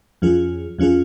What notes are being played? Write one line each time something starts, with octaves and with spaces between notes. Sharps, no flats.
F2 F3 C#4 F4 G#4
F2 F3 C#4 F4 G#4